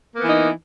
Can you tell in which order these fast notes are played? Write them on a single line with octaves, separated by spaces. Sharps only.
A#3 B3 E3 D#4